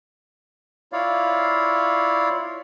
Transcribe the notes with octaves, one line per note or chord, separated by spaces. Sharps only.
E4 F4 C#5 D5 F5